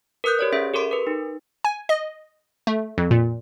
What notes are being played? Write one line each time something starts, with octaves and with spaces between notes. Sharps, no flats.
A#4 B4 D#6 F#6 G6
G4 C#5 D5
C#4 G#4 E5
G4 A4 A#4 C6 D7
A#4 B4
D#4
G#5
D#5
A3
F2
A#2